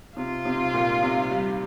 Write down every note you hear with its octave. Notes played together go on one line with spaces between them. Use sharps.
C3 F4
C3
A#2
C3
G3